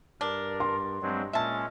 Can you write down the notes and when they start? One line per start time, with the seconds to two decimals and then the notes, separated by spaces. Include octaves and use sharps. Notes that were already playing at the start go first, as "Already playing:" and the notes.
0.21 G2 D4 A#4
0.60 C6
1.02 G2 F#3 G#3 C4
1.33 A#2 G#3 C#4 E5 A5